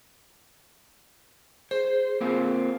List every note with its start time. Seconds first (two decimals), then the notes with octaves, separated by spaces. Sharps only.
1.71 G#4 C5
2.21 A#3 C4 F4